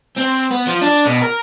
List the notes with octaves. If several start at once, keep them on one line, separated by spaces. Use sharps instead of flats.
C4
B3
F3
D4
B2
A#4